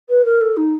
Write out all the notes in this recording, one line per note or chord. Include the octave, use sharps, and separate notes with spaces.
B4
A#4
A4
D#4